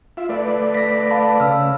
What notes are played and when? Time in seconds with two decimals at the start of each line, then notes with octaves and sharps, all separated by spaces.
0.17 F4 E5
0.29 A3 B4 D5
0.75 A#6 B6
1.11 F5 A5 B5
1.40 C#3 E6 F6